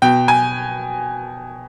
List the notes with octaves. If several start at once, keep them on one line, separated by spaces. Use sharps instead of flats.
B2 G5
G#5